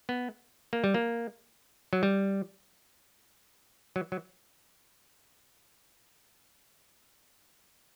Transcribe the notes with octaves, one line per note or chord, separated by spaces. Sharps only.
B3
A#3
G3
A#3
F#3
G3
F#3
F#3